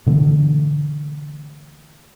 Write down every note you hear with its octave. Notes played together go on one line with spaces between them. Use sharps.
B2 D3 E3 A3